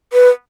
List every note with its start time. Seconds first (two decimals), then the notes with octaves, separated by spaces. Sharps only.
0.13 B4